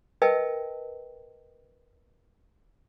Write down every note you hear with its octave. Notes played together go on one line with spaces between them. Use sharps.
A#4 B4 D#5 E5 G5 A5